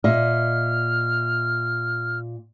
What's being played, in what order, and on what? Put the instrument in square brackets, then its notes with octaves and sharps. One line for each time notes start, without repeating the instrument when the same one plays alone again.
[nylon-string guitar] A#2 D#5 E5 [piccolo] F6